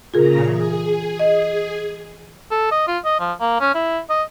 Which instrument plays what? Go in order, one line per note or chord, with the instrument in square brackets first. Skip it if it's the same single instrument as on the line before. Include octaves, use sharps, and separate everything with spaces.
[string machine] A#2 C#3 A#5 [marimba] F4 G#4 A#4
[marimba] E3 [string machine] G#4
[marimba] D#5
[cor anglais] A4
D#5
F4
D#5
F3
A#3
C#4
E4
D#5